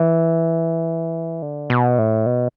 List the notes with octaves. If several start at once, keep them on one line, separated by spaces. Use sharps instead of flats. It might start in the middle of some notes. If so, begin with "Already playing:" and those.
Already playing: E3
D3
B2
A2
B2